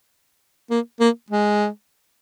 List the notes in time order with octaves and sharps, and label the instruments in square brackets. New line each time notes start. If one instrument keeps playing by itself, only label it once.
[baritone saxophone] A#3
A#3
G#3